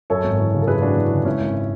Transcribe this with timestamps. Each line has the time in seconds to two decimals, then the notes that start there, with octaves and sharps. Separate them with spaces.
0.10 F#2 A4 C#5
0.24 G#1
0.39 E3
0.53 C#3
0.62 A4
0.67 F#2 G#4 B4
0.82 G#1 D4 F#4
0.97 E3
1.12 C#3
1.25 G#2 C#4 E4
1.41 G#1